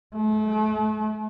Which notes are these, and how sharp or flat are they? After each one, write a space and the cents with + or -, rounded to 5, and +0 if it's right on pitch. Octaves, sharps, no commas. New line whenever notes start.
A3 -40